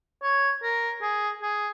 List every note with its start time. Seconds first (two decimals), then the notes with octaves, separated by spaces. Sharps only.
0.23 C#5
0.63 A#4
1.02 G#4
1.42 G#4